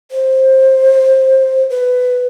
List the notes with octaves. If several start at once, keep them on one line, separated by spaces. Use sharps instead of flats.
C5
B4